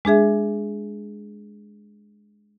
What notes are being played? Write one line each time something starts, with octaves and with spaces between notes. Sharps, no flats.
G#3 D4 G#4 E5